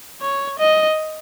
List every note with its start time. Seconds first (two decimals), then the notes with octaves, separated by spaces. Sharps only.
0.21 C#5
0.59 D#5